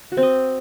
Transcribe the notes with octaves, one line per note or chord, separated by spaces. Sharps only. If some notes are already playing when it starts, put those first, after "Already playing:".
F#4
C4
D#5